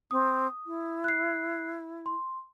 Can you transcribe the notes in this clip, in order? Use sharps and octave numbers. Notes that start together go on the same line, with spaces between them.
C4 D#6
E4
F#6 C7
C6